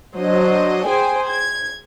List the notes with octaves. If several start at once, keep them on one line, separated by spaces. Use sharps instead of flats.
F#3 D4 C5 D#5
G#4 C5 G5 G#5
G#6